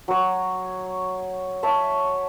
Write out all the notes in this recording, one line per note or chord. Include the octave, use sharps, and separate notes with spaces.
F#3 C#5
C#5 E5 A5